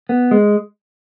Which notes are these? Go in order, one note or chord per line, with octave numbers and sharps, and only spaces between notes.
B3
G#3